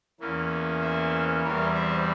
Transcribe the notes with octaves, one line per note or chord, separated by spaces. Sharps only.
E2 E3 A#3 C#4
C5 E5
E2 E3 G3 C4 A#4 C#5
C5 E5